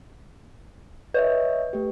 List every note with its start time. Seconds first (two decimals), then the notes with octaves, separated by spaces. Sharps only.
1.14 B4 C#5 D#5 E5
1.73 A3 G4